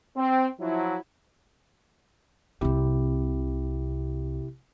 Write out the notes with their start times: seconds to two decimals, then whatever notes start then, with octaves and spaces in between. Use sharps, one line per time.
0.17 C4
0.60 F3 F#3 E4
2.61 C2 C3 C4 E4 G4